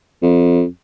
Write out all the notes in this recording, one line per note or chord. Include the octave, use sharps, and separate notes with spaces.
F2